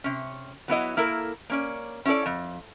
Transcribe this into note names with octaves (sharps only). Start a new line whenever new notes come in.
C3 C#4
F#3 B3 E4 D#5
A#3 E4 A4 A#4
A#3 C#4 D5
C#4 E4 F#4 A4 D5
F2